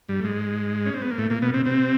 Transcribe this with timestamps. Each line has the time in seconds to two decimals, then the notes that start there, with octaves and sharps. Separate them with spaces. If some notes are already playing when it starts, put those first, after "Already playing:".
0.08 G2 G3
0.20 A3
0.24 G#2 G#3
0.86 C#4
0.94 C4
1.02 B3
1.11 A#3
1.18 A2 A3
1.30 A#2 A#3
1.42 B2 B3
1.54 C3 C4
1.65 C3 C4